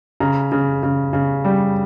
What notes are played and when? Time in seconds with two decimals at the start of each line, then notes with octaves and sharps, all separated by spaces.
0.20 C#3 A#5
0.52 C#3
0.83 C#3
1.13 C#3
1.44 G3